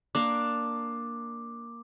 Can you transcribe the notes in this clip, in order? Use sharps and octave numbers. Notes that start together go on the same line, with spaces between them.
A#3 D4 D6